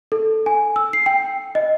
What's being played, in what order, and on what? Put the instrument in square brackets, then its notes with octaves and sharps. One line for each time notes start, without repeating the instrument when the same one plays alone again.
[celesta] A4
G#5
E6
C7
G5
D#5